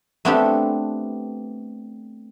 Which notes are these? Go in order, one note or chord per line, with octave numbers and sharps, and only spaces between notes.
A3 B3 C4 D4 G4 A4